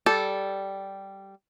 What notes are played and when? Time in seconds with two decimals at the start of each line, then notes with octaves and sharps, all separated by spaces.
0.06 G3 A4